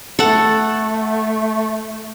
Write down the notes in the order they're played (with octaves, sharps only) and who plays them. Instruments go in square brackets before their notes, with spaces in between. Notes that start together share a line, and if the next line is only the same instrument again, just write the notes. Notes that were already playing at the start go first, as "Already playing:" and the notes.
[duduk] A3 [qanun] A4 F#5